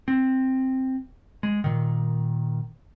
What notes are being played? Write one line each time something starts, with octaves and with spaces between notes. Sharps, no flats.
C4
G#3
A#2 D#3